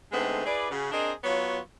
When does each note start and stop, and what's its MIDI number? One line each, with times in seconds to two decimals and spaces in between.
0.12 0.44 50
0.12 0.44 56
0.12 0.44 57
0.12 0.44 59
0.12 0.44 60
0.12 0.44 63
0.46 0.68 64
0.46 0.68 68
0.46 0.68 71
0.46 0.68 74
0.71 0.88 49
0.71 0.88 66
0.92 1.12 60
0.92 1.12 62
0.92 1.12 68
0.92 1.12 70
0.92 1.12 75
1.24 1.59 54
1.24 1.59 59
1.24 1.59 65
1.24 1.59 73